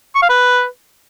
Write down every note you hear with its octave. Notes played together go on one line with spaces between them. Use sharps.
C#6
F5
B4